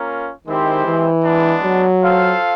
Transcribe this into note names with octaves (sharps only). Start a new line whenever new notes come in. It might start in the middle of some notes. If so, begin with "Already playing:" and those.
Already playing: A#3 C#4 F4 A#4
D#3 G#3 C4 E4 G4 C5
E3
G#3 B3 D4
F#3
F4 A4 C5 F5